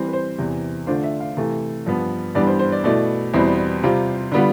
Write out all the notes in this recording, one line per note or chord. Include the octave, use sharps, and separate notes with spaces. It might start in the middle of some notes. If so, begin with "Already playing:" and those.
Already playing: E3 G3 C4
B4
C5
E2 C3 E3
D3 A3 D4 F4 C5
E5
F5
C3 E3 A3
G2 F3 B3
G2 E3 G3 B3 D4 D5
C5
C5
D5
B2 A3 E4 D5
E2 B2 G3 C4 E4
C3 G3 C4 F4
D3 G3 B3 F4